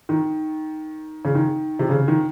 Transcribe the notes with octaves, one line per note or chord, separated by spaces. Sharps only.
D#3
C#3
D#3
C3
C#3
D#3